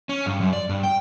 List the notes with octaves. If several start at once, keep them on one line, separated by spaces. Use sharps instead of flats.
C#4
G2
F#2
D5
G2
G5